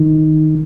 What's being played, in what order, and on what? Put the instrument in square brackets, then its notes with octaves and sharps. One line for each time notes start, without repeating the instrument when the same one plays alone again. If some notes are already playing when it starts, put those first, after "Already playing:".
Already playing: [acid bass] D#3